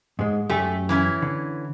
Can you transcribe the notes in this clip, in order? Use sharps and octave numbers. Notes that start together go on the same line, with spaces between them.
G#2 G#3
F#2 A3 G4 G#5
E3 C#4 E4
D3